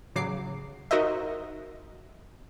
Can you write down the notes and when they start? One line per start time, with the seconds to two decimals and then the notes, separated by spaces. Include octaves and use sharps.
0.15 A1 C#3 F#3 D6 C7
0.91 D#4 F#4 A#4 C5 D#5 E5